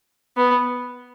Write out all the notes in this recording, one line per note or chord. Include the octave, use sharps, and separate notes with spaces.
B3